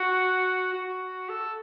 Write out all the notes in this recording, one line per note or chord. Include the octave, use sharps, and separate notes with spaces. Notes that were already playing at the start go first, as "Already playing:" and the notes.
Already playing: F#4
F#4
A4